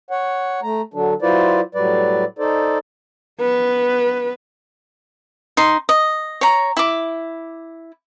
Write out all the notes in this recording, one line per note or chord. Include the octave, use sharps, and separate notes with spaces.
C#5 F#5
A3 A#5
D3 F#3 D4
F#3 E4 F4 B4 C5 D5
A2 F#3 G3 B4 D5
D#4 A4 C5 D5
B3 B4
D#4 C6
D#5
C#5 A#5
E4 D6